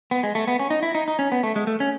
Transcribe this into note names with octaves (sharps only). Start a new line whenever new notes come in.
B3
G#3
A3
B3
C#4
D#4
E4
D#4
D#4
C#4
B3
A3
G#3
A3
C#4